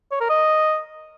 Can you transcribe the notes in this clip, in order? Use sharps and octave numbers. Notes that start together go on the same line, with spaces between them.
C#5
A#4
D#5